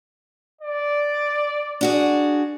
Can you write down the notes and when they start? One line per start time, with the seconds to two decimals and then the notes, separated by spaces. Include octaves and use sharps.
0.61 D5
1.81 D4 F#4 G#4